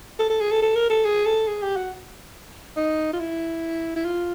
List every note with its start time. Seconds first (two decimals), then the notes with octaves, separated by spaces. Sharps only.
0.19 A4
0.30 A4
0.41 G#4
0.51 A4
0.62 A4
0.75 A#4
0.90 A4
1.05 G#4
1.26 A4
1.47 G#4
1.62 G4
1.76 F#4
2.76 D#4
3.13 F4
3.20 E4
3.96 E4
4.05 F4